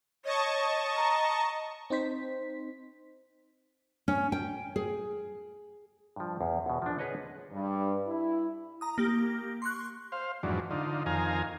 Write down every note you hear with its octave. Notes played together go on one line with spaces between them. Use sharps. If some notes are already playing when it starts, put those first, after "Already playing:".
C#5 D#5 A5 C#6
A#5
C4 D#4 C5 B6
C#4
G5
G#4
G2 F3
E2
E2 B2
F3 D4
G#4 B4 C#5 D#5 F#5
G2
E4
A#5 D#6
A#3 G4
C6 C#6 F#6
C5 F5
F2 G#2 E3 F#3 D4
D3 D#4 F4
F2 D#3 F5 G#5 A#5